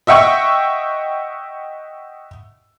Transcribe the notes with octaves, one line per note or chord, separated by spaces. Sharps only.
D#5 E5 F#5 G5 C#6 E6